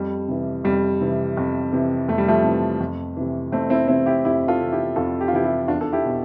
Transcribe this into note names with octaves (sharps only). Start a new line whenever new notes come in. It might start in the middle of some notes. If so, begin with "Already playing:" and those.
Already playing: F2 G3
C3 E3
F2 G3
C3 E3
F2
C3 E3
F2 A3
G3
F3 A3
C3 E3
F2
C3 E3
F2 A3 C4
C4 E4
C3 E3 C4 E4
E4 G4
F2 E4 G4
F4 A4
C3 E3
E4 G4
F2 F4 A4
G4
F4
C3 E3 E4 G4
E4 G4
E2 D4 F4
A4
E4 G4
B2